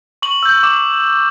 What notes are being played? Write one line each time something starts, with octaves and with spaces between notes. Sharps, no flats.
C#6 F#7
E6 G6
D6